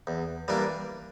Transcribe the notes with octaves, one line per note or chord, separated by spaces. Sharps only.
E2
E3 G3 A#3 D4